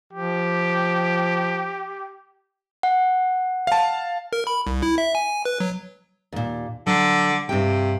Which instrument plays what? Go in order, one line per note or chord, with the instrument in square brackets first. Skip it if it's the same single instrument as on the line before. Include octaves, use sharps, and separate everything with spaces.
[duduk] F3 [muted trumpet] G4
[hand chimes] F#5
[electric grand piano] F5 A5
[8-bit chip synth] A#4
B5
C2
E4
E5
G#5
G#5
B4
F#3
[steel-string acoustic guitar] D#2 A#2
[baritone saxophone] D3 [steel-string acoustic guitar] F#3
[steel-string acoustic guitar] G2 G5 [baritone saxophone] C3